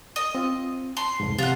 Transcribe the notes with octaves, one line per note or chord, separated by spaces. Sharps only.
D#5
C4 F4
C6
C2 F2 G#2
C3 F3 F4 F#5